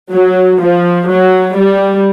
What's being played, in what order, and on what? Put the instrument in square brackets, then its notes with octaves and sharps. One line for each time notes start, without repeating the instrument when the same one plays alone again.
[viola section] F#3
F3
F#3
G3